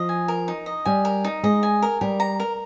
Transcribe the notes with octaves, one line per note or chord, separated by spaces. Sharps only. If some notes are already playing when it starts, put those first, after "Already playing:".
Already playing: F3 D#5
G#5
A#4
D#4
D#5
G3 G#5
A#4
D#4
G#3 D#5
G#5
A#4
G3 A#4
A#5
A#4